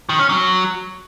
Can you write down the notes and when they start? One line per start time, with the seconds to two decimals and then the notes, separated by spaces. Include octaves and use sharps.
0.09 D#3
0.19 C#4
0.29 F#3